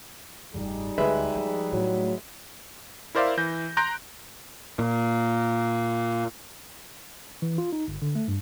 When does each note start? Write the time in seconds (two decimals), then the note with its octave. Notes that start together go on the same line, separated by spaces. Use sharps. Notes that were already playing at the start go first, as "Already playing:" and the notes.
0.54 F1 G2 G3 D#4 G#4
0.98 D2 G#3 B4 E5
1.35 F3
1.72 A2 F#3 A3
3.15 E4 A#4 C5 D5 E5 F5
3.37 E3 G6 A#6
3.77 A#5 C6 F#6 G6 A#6 D7
4.79 A#2
7.42 E3
7.58 F4
7.73 D#4
7.88 G1
8.02 D3
8.15 A3
8.28 G2